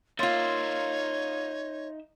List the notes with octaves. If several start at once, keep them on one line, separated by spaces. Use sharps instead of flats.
A#3 D#4 F4 C#5 E5 C6 A6